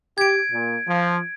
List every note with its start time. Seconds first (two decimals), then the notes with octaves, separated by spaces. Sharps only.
0.18 G4 G#6 D7
0.52 A#2
0.87 F3